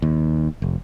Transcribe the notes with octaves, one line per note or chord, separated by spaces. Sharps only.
D#2
F1